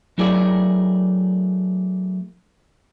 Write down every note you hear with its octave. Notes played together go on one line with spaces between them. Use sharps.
F#3 A3 E4 G#4 A#4 D5